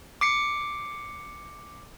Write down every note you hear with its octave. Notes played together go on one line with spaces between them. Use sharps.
D6 C7 C#7